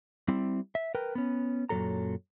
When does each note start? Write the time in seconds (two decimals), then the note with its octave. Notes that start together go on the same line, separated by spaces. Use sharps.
0.28 G3 C4 E4
0.75 E5
0.95 A#4 B4 G5
1.15 B3 C#4
1.69 F#2 A#2 E3 F#3 A4 A#5